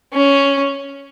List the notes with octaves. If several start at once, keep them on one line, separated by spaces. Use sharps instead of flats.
C#4